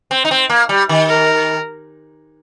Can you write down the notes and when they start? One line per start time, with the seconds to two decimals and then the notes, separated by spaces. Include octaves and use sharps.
0.11 C4
0.25 D#4
0.31 C4
0.50 A#3
0.69 G3
0.89 D#3
1.09 A#4